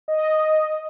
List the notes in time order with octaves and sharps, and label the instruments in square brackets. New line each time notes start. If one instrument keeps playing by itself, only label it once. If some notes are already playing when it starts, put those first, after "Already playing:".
[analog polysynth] D#5